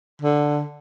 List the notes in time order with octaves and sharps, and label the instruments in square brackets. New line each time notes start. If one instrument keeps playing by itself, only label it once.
[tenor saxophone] D3